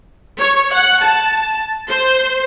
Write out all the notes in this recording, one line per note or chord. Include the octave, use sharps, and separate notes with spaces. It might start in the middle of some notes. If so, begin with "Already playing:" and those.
C#5
F#5
A5
C5